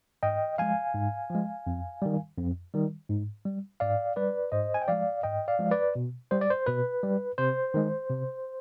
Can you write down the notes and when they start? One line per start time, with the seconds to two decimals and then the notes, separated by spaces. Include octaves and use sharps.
0.23 G#2 D#5 G5
0.58 F3 G#3 F5 G#5
0.95 G#2
1.30 F3 G#3
1.67 F2
2.02 D#3 G3
2.38 F2
2.74 D#3 G3
3.09 G#2
3.45 G3
3.80 G#2 D5 F5
4.16 G3 B4 D5
4.52 G#2 C5 D#5
4.74 G#5
4.82 G5
4.88 F3 G#3 D5 F5
5.23 G#2 D#5 G5
5.48 D5 F5
5.59 F3 G#3
5.71 B4 D5
5.95 B2
6.31 G3 C5
6.41 D5
6.50 C5
6.66 B2 B4
7.03 G3
7.38 C3 C5
7.74 D#3 G#3
8.09 C3